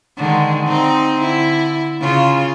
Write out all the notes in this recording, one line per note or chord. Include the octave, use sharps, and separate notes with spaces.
D3 D#3 G#3
C4 D#4
D3 E4
C#3 F4